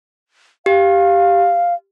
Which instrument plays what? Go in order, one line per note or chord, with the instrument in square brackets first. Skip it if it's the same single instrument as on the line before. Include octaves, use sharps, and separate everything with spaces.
[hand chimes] G4 [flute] F5